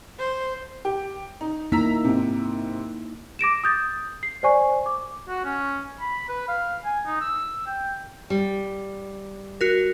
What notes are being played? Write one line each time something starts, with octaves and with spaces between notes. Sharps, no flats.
C5
G4
D#4
A#3 D#4 E4 A#5 E6 B6
G#2 C3
D6 A#6 D7 E7
D#6 G6 A6
C7
C5 D5 G#5 C#6
D6
F#4
C#4
B5
B4
F5
G#5
D#4
E6
G5
G3
F#4 A#4